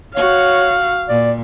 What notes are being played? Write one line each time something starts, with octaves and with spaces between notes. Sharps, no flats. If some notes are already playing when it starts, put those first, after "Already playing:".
F#4 C#5 F5
A#2 D5